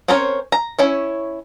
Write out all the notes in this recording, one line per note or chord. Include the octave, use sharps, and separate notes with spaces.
C4 C#4 A#4 C5 C#5
A#5
C#4 E4 C#5